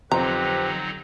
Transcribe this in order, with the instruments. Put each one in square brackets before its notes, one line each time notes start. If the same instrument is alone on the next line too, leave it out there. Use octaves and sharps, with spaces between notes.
[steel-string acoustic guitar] F2 [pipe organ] D3 F#3 D#4 [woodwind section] C4 G4 B4 [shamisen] A#5